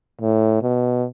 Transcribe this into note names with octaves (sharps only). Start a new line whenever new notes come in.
A2
B2